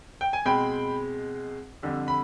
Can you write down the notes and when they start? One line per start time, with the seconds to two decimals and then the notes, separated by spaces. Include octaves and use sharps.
0.21 G5
0.33 G#5
0.45 B2 G#3 C4 G5 B5
1.83 F2 D3 G3
2.08 B5